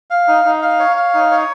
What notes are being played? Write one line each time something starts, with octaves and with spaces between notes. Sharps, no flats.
F5
D#4
D#4
F5
C#5
F5
D#4
C#5